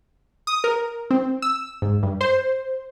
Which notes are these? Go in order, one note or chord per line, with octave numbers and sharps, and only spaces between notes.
D#6
A#4
C4
E6
G#2
G2
C5